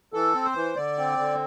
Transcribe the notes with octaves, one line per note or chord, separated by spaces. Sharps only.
E3 A4
C4
C5
E3
D3 D5
C4
D3